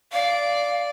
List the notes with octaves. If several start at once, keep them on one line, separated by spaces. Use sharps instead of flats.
D5 F5